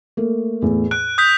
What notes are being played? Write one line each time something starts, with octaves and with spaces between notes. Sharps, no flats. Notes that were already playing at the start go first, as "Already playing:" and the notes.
A3 A#3
E2 A2
F#6 D7
D#6 G6 B6